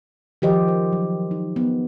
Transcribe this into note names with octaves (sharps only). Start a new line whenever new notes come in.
D#3 F3 G4 C5 D#5
C5
F#3
D#4
B3